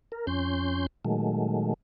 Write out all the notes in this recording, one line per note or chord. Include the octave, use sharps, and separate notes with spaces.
A#4
F2 C#4 C6 G6
A#2 D#3 F#3 G#3 A3